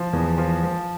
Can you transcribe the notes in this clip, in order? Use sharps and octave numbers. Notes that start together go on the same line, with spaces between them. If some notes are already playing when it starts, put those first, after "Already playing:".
Already playing: F3
E2
F3
F3